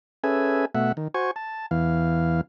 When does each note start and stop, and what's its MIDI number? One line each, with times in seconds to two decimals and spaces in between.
0.24 0.65 61
0.24 0.65 68
0.24 0.65 69
0.24 0.65 71
0.24 0.65 76
0.24 0.65 80
0.75 0.92 47
0.75 0.92 57
0.75 0.92 76
0.75 0.92 78
0.97 1.08 51
1.14 1.31 66
1.14 1.31 72
1.14 1.31 80
1.14 1.31 85
1.36 1.66 81
1.71 2.41 40
1.71 2.41 52
1.71 2.41 77